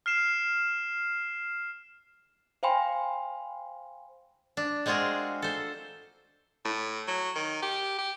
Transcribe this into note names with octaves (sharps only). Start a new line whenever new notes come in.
F6 C7 E7
C5 F5 G5 G#5 B5 C6
D4
G#3 C4 F4 F#4 G#4 A#4
A4 C5
A2
F#3
D#3
G4
G4